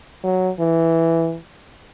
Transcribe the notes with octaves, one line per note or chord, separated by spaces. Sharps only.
F#3
E3